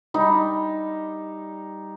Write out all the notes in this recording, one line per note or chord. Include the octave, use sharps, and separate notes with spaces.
G3 D#4